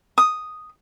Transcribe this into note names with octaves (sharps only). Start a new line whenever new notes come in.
D#6